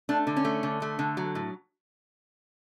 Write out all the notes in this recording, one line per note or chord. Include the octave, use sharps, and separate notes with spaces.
A3 D4
D3
C#4
A3
D3
A3
D3
F#3
A2